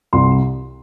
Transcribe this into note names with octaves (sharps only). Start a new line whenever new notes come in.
C2 C6